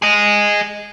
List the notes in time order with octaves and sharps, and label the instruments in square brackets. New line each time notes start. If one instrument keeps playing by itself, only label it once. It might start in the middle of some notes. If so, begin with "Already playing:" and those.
[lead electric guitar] G#4 D#5